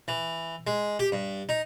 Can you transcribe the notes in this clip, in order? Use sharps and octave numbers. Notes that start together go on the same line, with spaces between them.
E3
G#3
G4
G2
D#4